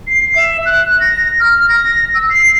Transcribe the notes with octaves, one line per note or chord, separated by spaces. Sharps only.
C7
E5
F#6
A#6
F6
A#6
E6
C7